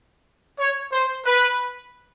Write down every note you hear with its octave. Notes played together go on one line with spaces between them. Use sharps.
C#5
C5
B4